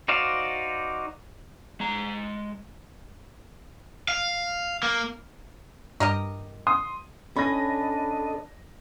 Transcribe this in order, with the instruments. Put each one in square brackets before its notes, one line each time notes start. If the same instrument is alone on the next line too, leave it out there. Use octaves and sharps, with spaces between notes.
[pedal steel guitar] D#4 F#4 C5 D5 F5
[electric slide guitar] G#3 A#5
[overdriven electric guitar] F5
A#3
[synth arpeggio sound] G2 [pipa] G4 A#4 D#5
[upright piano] C6 D#6
[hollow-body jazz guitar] C#4 [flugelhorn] D4 [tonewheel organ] A4 D#5 [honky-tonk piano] B5 A#6